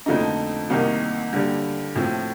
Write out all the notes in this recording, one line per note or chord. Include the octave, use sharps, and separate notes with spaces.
F2 D3 F3 A3 D#4
C2 C3 D#3 A#3 D#4
G2 D3 G3
A2 F3 C4